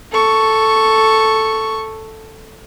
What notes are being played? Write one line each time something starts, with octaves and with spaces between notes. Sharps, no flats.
A4 C#6